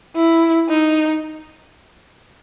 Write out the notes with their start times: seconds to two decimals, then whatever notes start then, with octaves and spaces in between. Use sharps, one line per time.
0.15 E4
0.69 D#4